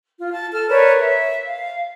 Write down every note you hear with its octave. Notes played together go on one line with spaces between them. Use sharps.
F4
A5
A4 F6
A#4 B4 C#5 D5
E5
F5